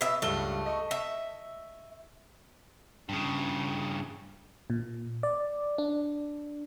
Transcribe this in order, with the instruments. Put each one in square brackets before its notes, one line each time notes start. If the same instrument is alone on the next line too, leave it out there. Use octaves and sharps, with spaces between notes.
[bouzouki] B2 E5
[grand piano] C#2 G2 G7 [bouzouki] A3
[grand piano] D#5 C#6
[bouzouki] E5
[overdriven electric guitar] G2 C#3
[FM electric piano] A#2
D5
D4